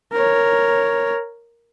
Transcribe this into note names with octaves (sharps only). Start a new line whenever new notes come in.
A#4 C#5